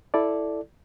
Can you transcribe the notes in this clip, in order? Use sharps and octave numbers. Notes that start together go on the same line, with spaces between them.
E4 A4 D5